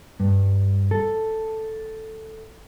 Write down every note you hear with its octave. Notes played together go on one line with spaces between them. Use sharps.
G2
A4